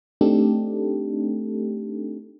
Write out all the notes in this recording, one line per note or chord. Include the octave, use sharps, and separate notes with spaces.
A3 C4 D4 D#4 G4 A4